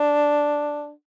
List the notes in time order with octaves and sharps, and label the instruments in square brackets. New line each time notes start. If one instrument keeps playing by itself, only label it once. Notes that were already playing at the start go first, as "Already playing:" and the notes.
Already playing: [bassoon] D4